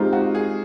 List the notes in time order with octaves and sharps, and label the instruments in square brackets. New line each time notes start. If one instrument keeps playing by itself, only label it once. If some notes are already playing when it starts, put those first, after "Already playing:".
Already playing: [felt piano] G#3 C4 D#4 G4 [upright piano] F4
[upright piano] F#4
G#4